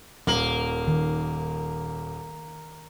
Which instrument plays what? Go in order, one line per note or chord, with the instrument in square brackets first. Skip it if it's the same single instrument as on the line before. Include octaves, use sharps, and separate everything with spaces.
[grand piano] D#1 F#7 [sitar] A#3
[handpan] D#3